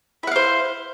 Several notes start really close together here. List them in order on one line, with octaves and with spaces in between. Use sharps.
E4 F#5 F5 C5